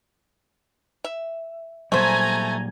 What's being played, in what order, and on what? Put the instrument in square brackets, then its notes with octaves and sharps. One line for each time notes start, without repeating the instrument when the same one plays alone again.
[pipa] E5
[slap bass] A#2 F#3 G3 [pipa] A3 C5 [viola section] G#5 A#5